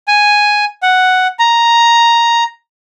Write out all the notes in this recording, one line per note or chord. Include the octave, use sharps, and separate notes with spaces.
G#5
F#5
A#5